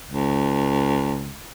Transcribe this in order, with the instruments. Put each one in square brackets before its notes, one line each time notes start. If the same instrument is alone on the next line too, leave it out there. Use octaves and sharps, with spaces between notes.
[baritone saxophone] C#2